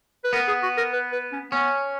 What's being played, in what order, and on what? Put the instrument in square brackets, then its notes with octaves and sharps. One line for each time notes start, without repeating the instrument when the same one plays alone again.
[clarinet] B4
[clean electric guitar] B3 [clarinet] A#4
[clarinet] G#4
F#4
A#4
B4
B4
C#4
[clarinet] B3 [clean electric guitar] C#4